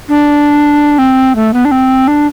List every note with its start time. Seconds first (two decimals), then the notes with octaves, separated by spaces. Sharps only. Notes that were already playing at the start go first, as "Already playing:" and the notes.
0.09 D4
0.98 C4
1.35 A3
1.53 B3
1.65 D4
1.71 C4
2.08 D4